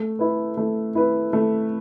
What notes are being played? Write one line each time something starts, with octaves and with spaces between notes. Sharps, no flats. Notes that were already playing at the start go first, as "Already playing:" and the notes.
Already playing: A3
E4 B4
A3
E4 B4
A3